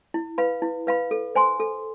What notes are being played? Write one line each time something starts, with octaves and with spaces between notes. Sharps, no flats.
E4
B4 F5 B5
E4
B4 F5 B5
A4
C5 G#5 C6
A4